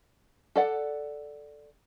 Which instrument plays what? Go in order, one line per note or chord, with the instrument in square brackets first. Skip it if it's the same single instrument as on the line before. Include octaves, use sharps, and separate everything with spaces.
[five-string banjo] A4 D5 F#5